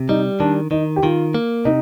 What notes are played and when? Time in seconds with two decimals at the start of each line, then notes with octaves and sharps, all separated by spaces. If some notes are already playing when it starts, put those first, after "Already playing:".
Already playing: C3
0.09 G3 D#4
0.40 D#3 D4
0.71 D#3 D#4
0.96 G4
1.03 D#3 F4
1.34 A#3
1.65 C3 D#4